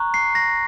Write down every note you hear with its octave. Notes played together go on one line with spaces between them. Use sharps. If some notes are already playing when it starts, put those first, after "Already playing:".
Already playing: A#5 C#6 F#6
C7
A#6